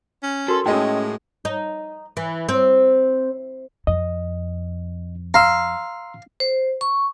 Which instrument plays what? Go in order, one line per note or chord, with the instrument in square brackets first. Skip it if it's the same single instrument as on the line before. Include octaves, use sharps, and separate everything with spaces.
[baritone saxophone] C#4
[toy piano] F#4 A#4 C6 [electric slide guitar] A4
[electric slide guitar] A2 [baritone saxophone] G#3 [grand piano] C#4 D#5 G5 [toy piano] D#4 F#4 A4
[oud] D#4
E3
C4
[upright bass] F2 [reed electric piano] D#5
[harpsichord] F5 [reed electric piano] A#5 C6 E6
[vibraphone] C5
C#6